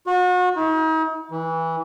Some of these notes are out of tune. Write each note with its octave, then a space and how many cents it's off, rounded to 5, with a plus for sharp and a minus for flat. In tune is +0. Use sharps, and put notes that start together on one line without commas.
F#4 -35
D#4 +40
E3 -15